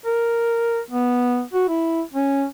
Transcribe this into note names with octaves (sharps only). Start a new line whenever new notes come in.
A#4
B3
F#4
E4
C#4